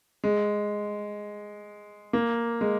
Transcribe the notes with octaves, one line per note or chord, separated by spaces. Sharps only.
G#3
A#3
G#3